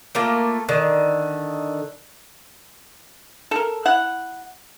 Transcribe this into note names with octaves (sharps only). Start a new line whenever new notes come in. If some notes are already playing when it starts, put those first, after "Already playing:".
A3 A#3 F4
D3 D#3
A4 A#4
E4 F#5